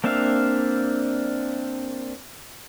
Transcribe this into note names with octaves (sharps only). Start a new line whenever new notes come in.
A#3 C4 D4 E5 F5